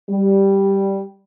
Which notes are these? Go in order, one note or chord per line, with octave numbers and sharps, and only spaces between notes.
G3